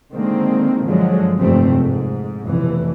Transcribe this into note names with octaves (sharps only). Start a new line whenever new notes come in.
D3 D#3 G#3 A#3 C4
G2 D3 F3 F#3 G#3
F1 G2 C3 A3 C4
G#2
F1 F2 B2 E3